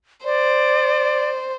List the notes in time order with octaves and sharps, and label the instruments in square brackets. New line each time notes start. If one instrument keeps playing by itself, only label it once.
[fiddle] C5 [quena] D5